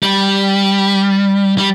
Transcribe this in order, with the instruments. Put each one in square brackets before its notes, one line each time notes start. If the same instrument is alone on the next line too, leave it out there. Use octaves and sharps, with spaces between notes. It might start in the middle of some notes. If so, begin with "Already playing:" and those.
[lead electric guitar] G3
G3